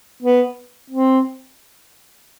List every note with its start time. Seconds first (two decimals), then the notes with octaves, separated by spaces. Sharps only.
0.22 B3
0.90 C4